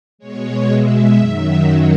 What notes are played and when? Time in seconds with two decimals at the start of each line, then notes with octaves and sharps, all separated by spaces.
0.19 B2 G#3 C#5
0.68 E5
1.17 F#2 D#3 F#3
1.67 C#5